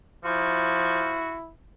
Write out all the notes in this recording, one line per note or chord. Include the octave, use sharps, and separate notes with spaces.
F3 E4 F#4